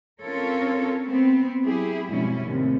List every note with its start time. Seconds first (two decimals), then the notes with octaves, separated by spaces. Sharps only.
0.21 C4 C#4 F4 A4 A#4 C#5
1.05 B3 C4
1.62 F#3 E4 G4 G#4
2.09 F2 G#2 B2 G3 C#4 E4
2.44 D#2 A2 C3